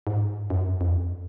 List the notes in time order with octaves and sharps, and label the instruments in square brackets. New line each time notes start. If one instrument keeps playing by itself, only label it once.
[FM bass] G#2
F#2
F2